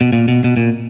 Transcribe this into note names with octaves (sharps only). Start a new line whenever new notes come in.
B2
A#2
B2
B2
A#2